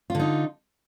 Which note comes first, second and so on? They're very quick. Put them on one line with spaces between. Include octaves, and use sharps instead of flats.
F4 D3 D#4